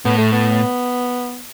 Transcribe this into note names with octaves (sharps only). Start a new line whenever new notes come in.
A2 B3
A3
B3